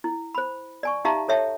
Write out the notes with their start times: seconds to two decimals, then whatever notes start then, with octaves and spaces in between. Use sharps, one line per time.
0.04 E4
0.35 C5 B5
0.83 D5 G#5 C#6
1.05 D#4 G4 E5 F5 A5 A#5
1.28 A4 C#5 E5 G5 A5